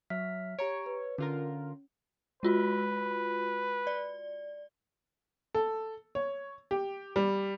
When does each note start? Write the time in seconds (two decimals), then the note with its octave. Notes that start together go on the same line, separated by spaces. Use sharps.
0.10 F#3 E5 F6 B6
0.59 G4 C#5 A#5 D7
0.86 B4
1.18 D3 C#4 F4 A#4
2.43 G#3 F4 F#4 B4
3.87 D5
5.55 A4
6.15 C#5
6.71 G4
7.16 G3